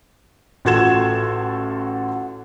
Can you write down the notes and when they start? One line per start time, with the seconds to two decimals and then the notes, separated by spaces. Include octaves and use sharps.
0.65 A1 F4 F#4 A4 G#6 E7